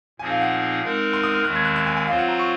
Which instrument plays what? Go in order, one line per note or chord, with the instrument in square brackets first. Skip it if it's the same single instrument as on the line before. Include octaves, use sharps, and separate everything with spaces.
[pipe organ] A#2 F3 C4 D#4 G#4 [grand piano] G#5
[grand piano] F5
F#5
[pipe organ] G#3 C4 D#4 A#4
[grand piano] C6
D#6
F6
[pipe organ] D#2 D#3 G#3 C4 [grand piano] F#6
[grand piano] G#6
F#6
F#6
G#5
G#5
[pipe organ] F#3 C4 F4 C5 [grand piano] F5
[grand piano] F#5
A#5
C#6